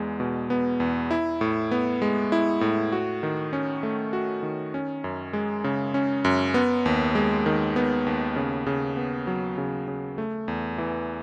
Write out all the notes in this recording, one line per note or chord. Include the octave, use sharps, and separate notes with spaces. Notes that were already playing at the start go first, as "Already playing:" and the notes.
Already playing: E2 G#3 B3
B2
B3
E2
E4
A2
B3
G#3
E4
A2
F#4
D#3
C#4
A3
F#4
D#3
C#4
F#2
G#3
C#3
C#4
F#2
B3
D#2
G#3
D#3
B3
D#2
C#3
C#3
B3
F#3
C#3
C#3
A3
E2
E3